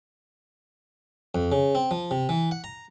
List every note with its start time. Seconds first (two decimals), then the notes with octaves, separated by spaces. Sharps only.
1.35 F2
1.52 C#3
1.75 C4
1.91 F3
2.11 C3
2.29 E3
2.51 F#5
2.64 A#5